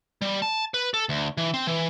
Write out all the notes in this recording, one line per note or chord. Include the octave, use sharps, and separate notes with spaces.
G3
A5
B4
A4
D2
E3
C4
E3